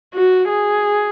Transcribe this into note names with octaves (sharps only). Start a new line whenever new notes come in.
F#4
G#4